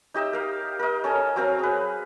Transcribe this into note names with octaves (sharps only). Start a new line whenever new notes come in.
D#4 G4 D#5 E5
A#4 F5
A#4 D#5
C#4 A4 G#5 A#5
F#3 C4 A#4 F5
G#4 B4